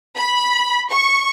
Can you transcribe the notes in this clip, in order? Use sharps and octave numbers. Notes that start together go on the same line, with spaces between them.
B5
C#6